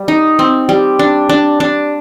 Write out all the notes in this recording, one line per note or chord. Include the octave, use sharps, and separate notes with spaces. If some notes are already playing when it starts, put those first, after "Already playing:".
Already playing: G3
D#4
C4
G3
D4
D4
D4